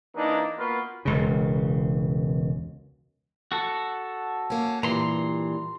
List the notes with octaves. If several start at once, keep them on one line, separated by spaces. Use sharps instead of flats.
E3 A#3 D4 D#4
A#3 B3 F4 F#4 A#4 B4
E1 C#2 C#3
F#4 A4
A#3 C#4
G2 A#2 E3 A#5 C6